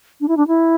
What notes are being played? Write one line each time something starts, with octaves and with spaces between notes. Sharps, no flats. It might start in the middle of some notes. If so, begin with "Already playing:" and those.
D4
E4
D4
E4